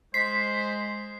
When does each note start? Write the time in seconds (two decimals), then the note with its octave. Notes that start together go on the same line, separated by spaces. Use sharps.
0.14 G#3 C5 B6 C7